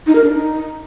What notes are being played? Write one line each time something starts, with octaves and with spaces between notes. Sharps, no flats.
D#4
A#4
D4
D#4